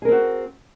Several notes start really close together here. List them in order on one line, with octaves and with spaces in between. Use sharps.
G#4 A#4 C4 F#4